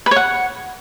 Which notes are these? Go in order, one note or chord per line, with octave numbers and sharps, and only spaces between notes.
B4
C#5
F#5